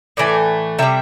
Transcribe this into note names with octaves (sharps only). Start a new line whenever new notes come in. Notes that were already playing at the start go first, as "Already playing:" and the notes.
A2 E3 A3 D5
C3 G3 E5